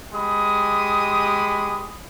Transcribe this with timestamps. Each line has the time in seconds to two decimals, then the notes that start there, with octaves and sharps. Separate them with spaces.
0.13 G#3 G4 B5 D#6